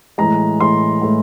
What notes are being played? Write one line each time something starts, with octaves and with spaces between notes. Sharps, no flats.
A2 E3 G#3 A#5
A2 E3 G#3 C6
A2 E3 G#3